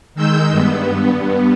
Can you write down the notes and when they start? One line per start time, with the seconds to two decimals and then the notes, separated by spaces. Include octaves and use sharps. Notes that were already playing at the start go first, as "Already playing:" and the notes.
0.15 D#3 G#3 E6 G6
0.51 G2 B3